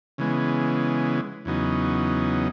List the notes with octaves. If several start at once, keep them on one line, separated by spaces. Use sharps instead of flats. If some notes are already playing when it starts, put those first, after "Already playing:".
C#3 E3 G#3 B3
E2 C#3 F#3 B3 D#4